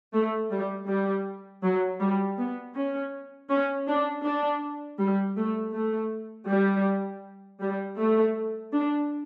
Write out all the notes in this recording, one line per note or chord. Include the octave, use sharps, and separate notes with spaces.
A3
G3
G3
F#3
G3
B3
C#4
C#4
D4
D4
G3
A3
A3
G3
G3
A3
D4